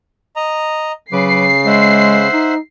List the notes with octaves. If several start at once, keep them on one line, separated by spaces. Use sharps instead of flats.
D#5 A#5
C#3 F#3 B4 D6 C7
G#3 C5 E5 F#5
D#4